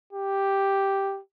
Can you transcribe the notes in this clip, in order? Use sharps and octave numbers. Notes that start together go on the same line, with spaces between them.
G4